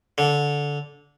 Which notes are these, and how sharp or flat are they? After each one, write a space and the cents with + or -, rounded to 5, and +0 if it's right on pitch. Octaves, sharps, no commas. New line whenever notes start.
D3 -15